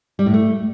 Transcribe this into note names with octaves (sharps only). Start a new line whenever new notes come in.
G3
A2
A3